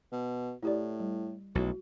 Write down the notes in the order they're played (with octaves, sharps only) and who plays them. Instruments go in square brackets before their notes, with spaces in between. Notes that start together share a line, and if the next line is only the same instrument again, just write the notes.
[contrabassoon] B2
[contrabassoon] A2 [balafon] E4 G4 D5
[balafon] G3
[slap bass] B1 [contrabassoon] A2 [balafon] F#4